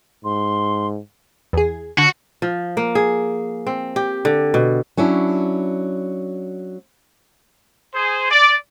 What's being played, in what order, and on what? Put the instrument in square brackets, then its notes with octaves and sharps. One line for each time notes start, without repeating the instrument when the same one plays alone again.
[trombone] G#2 [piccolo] C6
[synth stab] E2 G#4
[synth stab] D3 [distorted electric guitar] F#4
[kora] F3
A#3
G#4
C4
G4
D3
B2
[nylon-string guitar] F#3 C#4 D4 E4
[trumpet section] G#4 C5
D5